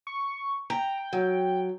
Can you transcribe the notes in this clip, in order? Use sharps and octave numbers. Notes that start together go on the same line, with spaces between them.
C#6
G5 A#5
F#3